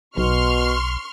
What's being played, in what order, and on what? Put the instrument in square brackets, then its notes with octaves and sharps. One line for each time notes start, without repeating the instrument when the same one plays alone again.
[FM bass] B1 [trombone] B2 [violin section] C6 C#6 F6